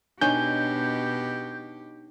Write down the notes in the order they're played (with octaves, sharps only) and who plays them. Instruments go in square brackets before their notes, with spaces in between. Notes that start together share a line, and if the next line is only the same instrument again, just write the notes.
[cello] B2 G4 [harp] D4 D#4 C#5 [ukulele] G#5 [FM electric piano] G6